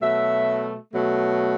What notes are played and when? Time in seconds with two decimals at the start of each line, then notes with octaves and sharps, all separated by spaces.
0.01 B2 F#3 A3 E5
0.92 B2 F#3 A3